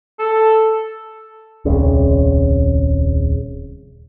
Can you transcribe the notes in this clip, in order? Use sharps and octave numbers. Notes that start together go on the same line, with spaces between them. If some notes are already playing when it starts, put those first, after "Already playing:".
A4
D#1 C2 C#3